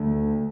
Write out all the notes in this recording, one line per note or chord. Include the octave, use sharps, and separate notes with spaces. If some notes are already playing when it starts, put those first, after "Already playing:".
Already playing: D2 D3 A3